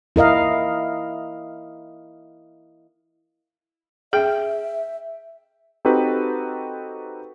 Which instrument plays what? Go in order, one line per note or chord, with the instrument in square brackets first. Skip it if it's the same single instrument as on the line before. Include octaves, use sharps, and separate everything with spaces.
[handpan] E4 A#4 D#5 F5
[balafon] G#4 [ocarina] E5 [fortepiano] G5
[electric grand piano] C4 D#4 F#4 G4 A4 B4